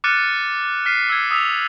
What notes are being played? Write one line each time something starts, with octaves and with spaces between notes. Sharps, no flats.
D6 F6 F#6 A6 C#7 D#7
F6 B6 C7 D#7
E6 G#6
D#6 E6 B6 F7